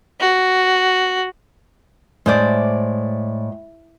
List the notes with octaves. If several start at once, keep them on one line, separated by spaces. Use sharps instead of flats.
F#4
A2 G#3 C5 D5